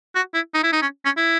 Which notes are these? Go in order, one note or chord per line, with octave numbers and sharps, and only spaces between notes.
F#4
E4
D#4
E4
D#4
C#4
C#4
E4